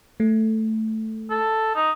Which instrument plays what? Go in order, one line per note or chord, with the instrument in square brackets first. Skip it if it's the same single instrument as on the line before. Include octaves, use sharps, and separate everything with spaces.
[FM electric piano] A3
[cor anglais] A4
D#4